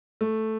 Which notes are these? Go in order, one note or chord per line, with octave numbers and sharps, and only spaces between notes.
A3